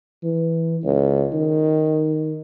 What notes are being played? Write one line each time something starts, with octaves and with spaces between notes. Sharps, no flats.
E3
C#2
D#3